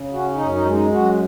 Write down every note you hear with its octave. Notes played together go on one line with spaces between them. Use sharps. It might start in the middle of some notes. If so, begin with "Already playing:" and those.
Already playing: C#3
C#4 F#4
D#4
F#2
D#4
G#3
D#4
F#2 F#4